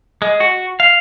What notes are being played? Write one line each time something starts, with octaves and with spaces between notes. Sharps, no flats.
G#3
F#4
F5